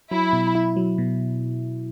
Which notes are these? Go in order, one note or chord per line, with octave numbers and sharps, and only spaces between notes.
F#3 E4
B2
E4
F#3
B2